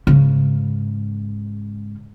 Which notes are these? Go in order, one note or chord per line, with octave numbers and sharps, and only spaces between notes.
G#2 C#3